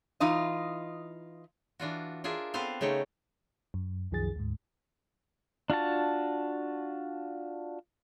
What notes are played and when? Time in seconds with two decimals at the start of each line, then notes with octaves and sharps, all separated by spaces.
0.20 E3 D#4 F4 D#5
1.79 E3 D4 F4 F#4
2.24 D4 F4 G#4 A#4 E5
2.54 B3 C4 A4 B4 C5 F5
2.81 C#3 A3 D#4 C#5 G5
3.74 F#2
4.11 C2 F#2 D#3 F3 G#4 A6
4.36 D2 G#2
5.70 D4 F4 F#4 A5